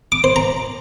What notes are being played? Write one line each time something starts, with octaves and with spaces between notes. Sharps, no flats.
D6
C5
A#5